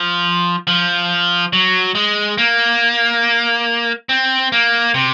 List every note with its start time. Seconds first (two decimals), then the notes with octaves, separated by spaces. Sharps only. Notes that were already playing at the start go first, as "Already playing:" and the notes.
Already playing: F3
0.67 F3
1.53 F#3
1.95 G#3
2.38 A#3
4.09 C4
4.52 A#3
4.94 C3